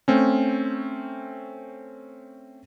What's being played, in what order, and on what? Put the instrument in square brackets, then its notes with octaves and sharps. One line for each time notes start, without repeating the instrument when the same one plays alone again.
[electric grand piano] A3 C4 C#4